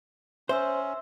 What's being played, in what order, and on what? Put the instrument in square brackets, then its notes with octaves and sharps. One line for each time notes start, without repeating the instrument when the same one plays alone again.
[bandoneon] C#4 [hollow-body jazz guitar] C5 [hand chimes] E5 C6 E6